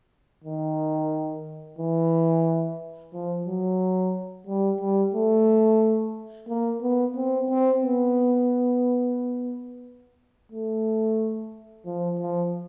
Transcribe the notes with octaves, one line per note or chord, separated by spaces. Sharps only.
D#3
E3
F3
F#3
G3
G3
A3
A#3
B3
C4
C4
B3
A3
F3
F3